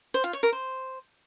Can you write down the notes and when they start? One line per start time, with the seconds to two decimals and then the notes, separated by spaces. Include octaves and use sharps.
0.14 C5
0.24 F4
0.33 C#5
0.43 A#4
0.52 C5